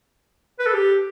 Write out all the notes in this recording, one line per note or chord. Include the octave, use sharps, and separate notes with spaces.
B4
A4
G4